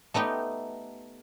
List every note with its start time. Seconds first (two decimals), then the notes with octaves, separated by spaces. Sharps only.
0.14 A3 B3 D#4 G4